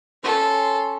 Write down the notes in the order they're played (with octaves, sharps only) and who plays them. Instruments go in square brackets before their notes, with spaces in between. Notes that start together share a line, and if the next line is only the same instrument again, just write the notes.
[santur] C#4 C#5 [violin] A4 C6